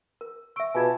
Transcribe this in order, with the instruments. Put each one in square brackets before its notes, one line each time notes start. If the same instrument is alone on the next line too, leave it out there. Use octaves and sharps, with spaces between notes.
[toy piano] A#4
[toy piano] E5 C#6 [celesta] E6 D7
[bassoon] B2 [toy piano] F4 G#4 G#5 [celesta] F5 B5 G#6 [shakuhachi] A5